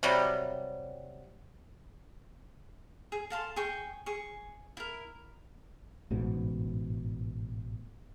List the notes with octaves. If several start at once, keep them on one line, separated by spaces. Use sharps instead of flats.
C3 F#3 G3
G#4
A4 F5 A5 C6
G#4 G5 C#6
G#4 C#6
E4 A#4
A1 G#2 B2